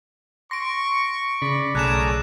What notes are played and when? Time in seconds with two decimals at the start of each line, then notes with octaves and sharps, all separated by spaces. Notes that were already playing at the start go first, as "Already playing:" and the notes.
0.51 C6 C#6 A#6 D7
1.42 C#3 D5 B5
1.75 B1 A3 C#4 G#4 D5 A#5 F#6 E7